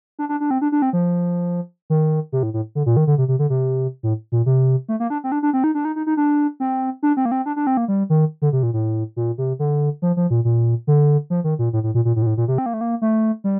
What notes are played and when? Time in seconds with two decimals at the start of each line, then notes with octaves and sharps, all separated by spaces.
0.19 D4
0.29 D4
0.40 D4
0.51 C4
0.62 D4
0.72 D4
0.82 C4
0.93 F3
1.90 D#3
2.32 C3
2.43 A2
2.54 A2
2.75 D3
2.86 A#2
2.97 D#3
3.07 D3
3.18 C3
3.28 C3
3.39 D3
3.50 C3
4.03 A2
4.32 A#2
4.46 C3
4.88 A3
5.00 A#3
5.10 D4
5.24 C4
5.32 D4
5.43 D4
5.53 C4
5.64 D#4
5.75 D4
5.85 D#4
5.96 D#4
6.07 D#4
6.17 D4
6.60 C4
7.03 D4
7.17 C4
7.25 A#3
7.32 C4
7.46 D4
7.56 D4
7.67 C4
7.77 A#3
7.88 G3
8.10 D#3
8.42 D3
8.53 C3
8.63 A#2
8.73 A2
9.16 A#2
9.38 C3
9.59 D3
10.02 F3
10.17 F3
10.30 A#2
10.45 A#2
10.87 D3
11.30 F3
11.44 D#3
11.59 A#2
11.73 A2
11.83 A2
11.94 A#2
12.05 A#2
12.16 A2
12.22 A#2
12.26 A2
12.37 A#2
12.48 C3
12.58 C4
12.66 A#3
12.74 A3
12.81 A#3
13.02 A3
13.44 G3